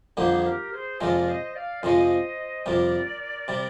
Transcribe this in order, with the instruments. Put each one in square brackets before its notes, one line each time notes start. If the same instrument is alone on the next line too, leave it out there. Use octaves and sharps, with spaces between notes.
[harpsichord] F2 D3 G3 A#3 [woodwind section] G#4 C5
[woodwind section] G4 A#4
G#4 C5
[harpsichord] F2 C3 F3 G#3 [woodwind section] A#4 D5
[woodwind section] C5 D#5
D5 F5
[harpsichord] F2 C3 F3 G#3 [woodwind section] C5 D#5
[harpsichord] F2 C3 G3 [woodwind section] A#4 D5
[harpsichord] C3 G3